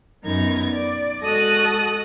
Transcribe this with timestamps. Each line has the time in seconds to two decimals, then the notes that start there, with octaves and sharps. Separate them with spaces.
0.25 F#2 B3 D#4 A#4 G#6
0.71 D5
1.22 G#3 F#4 A4 D#5 D#6 F#6